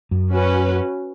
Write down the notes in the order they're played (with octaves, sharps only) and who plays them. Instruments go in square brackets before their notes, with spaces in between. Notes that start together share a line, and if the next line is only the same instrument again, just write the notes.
[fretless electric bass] F#2
[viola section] C#4 F#4 B4